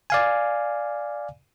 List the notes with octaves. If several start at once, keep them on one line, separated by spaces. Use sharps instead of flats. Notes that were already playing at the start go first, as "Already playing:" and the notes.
D5 F5 G#5